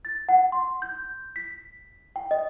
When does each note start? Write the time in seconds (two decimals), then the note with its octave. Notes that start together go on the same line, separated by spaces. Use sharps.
0.05 A6
0.29 F#5
0.52 C6
0.82 G6
1.36 B6
2.16 G5
2.31 D#5